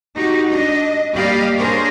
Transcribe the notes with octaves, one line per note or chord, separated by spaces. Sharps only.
D#4 F#4 G4
D4 D#5
G3 A#3 G4 D5 D#5 F5
D4 G#4 A#4 C5 C#5